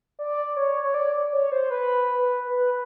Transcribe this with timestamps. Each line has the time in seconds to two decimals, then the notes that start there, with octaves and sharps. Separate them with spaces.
0.19 D5
0.57 C#5
0.83 C#5
0.94 D5
1.33 C#5
1.52 C5
1.71 B4
2.47 B4